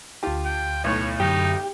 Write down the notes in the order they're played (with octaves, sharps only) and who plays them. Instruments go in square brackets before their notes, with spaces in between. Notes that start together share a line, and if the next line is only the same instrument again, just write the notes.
[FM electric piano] D2 A5 [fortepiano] F4 G4
[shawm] G5
[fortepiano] B1 A2 C#6 [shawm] C#5
[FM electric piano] F#2 D3 [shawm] D#4 [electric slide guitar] G4